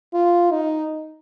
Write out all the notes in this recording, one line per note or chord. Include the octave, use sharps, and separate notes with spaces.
F4
D#4